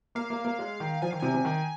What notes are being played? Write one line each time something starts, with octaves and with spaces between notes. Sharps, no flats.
A#3 F5
A#3
A#3
G#3
D#3
F3 G#5
D#3 F5
C3 G#5
C3
D#3